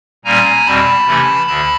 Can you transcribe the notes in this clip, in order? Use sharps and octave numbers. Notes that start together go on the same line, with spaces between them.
A#2 G3 A#3 C#4 G#5 A#5
E2 B2 G3 C4 A5 B5
C3 E3 A3 C#4
D2 D3 A5 B5